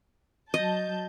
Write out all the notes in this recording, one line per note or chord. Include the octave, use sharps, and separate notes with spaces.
F#3 D#5 A5 G6